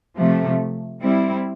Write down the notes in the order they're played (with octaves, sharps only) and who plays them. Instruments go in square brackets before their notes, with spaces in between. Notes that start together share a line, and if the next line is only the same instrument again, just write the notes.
[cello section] C3 F3 A3
G3 C4 E4